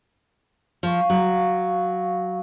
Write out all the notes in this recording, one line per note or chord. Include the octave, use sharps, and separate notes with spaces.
F3 F5 C#6
F#3